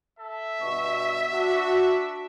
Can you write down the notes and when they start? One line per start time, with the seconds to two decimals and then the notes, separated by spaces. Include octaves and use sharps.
0.19 A4 E5
0.61 G2 B2 C#6
1.33 D4 F#4